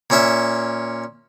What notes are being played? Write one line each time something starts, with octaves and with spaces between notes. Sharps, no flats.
A#2 C#4 E5